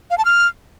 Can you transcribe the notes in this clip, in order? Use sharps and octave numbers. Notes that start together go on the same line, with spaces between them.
F5
A5
F6